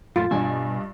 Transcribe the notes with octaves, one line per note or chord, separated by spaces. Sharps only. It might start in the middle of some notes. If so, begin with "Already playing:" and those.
F#2 A#2 A3 F4 A6
G2 B2 D4 D#5 G#5